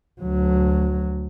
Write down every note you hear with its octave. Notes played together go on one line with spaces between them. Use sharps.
D2 F#3